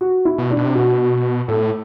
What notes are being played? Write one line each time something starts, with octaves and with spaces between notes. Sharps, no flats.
F#4
E4
B2
D4
B2
C3
B2 F#4
A2 A4